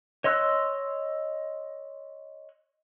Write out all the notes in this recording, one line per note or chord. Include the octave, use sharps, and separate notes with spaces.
C#5 D#5 C6 E6 F#6